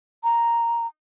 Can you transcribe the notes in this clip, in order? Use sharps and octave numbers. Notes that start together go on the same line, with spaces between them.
A#5